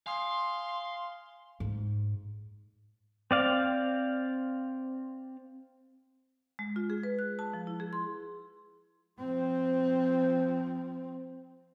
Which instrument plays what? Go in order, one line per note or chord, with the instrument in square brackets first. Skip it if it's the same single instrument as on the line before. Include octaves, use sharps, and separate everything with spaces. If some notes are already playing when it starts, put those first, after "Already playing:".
[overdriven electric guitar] F5 [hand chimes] G#5 D#6 [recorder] C6
[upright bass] G#2
[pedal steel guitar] C4 D5 F5
[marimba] G#3
F4
G#4
B4
F#6
A5
F3
E4
G#4
C6
[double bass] F3 C4